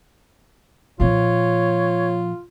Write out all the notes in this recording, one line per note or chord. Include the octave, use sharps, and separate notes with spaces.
A#2 F3 F4 C#5